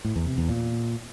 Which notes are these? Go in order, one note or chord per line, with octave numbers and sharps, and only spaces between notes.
A2
E2
C3
E2
A#2